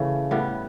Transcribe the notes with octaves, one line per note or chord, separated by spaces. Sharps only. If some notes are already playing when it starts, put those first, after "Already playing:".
Already playing: C#3 E3 A3
A2 G3 B3